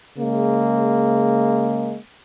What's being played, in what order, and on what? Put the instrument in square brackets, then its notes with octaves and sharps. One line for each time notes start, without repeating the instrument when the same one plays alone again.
[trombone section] C#3 G#3 A#3